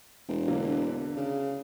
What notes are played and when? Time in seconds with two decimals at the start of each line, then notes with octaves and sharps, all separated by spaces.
0.29 E1
0.48 D3 F#3 A#3
1.17 C#3